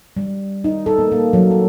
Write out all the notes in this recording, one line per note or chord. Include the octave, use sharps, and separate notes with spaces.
G3
D#4
A4
A#3
A#3
F#3
A4